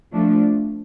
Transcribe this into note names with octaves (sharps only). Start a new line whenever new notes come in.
F3 A3 D4